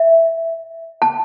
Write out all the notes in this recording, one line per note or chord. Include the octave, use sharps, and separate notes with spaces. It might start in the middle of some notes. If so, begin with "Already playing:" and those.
Already playing: E5
A5